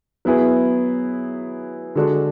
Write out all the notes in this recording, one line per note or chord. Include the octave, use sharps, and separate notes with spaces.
F#3 B3 E4 G#4 B4
D3 G#3 D4 F#4 A4